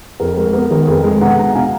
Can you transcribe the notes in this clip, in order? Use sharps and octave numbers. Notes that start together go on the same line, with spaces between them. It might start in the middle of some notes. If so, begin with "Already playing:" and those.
F2 A#4
G#3 A#4
B3 A#4
D#3 A#4
F2 G#4 B4
G#3
B2 F#5 A#5
B3 F#5 A#5
F#5
B2 F5 G#5